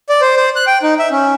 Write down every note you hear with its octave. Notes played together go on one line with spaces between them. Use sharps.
D5
C5
C5
F#6
G5
D#4
E5
C#4